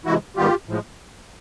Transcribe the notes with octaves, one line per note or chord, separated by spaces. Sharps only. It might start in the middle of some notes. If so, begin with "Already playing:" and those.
C3 E3 G#3 E4 F#4
G#2 D#3 G3 B3 F4 G4
A2 F3 G#3